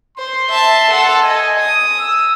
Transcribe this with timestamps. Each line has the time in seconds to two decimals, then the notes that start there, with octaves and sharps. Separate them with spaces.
0.18 C5 C6
0.50 E5 A5
0.91 A4 F#5
1.23 D#5 G#5
1.59 D#6
1.99 E6